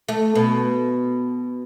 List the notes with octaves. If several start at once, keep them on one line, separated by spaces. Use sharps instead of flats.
A3
B2